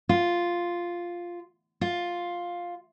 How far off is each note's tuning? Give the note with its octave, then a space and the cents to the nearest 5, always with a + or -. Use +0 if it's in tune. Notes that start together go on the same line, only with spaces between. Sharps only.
F4 +0
F4 +5